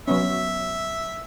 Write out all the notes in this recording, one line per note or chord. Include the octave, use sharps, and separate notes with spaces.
F#3 B3 C#4 E5